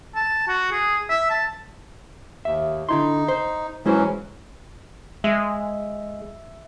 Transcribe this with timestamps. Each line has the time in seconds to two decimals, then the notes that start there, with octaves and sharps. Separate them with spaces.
0.15 A5
0.48 F#4
0.72 G#4
1.09 E5
1.30 A5
2.45 D#2 E5
2.89 D3 D#4 E4 C6
3.28 C5
3.86 E3 F#3 G#3 C#4 E4 C5
5.24 G#3 E5